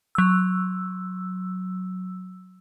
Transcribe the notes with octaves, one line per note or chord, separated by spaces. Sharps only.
F#3 E6